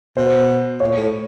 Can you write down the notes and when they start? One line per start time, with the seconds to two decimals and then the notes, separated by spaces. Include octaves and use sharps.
0.17 B2 C5
0.80 A#2 C#5
0.96 A2